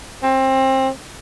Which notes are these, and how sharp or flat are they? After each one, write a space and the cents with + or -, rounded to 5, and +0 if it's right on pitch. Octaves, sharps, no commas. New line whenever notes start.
C4 +25